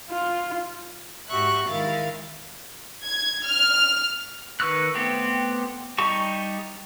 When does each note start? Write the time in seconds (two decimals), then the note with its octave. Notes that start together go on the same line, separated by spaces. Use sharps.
0.10 F4
1.28 G#2 F#4 G4 E5 C#6 F#6
1.67 D#3 G#3 E4 A#4 F5 A6
3.04 G#6
3.46 F6
4.60 D#3 B4 C#6 E6 F#6
4.95 A3 B3 C4 G4
5.98 G3 D#4 G4 A5 C#6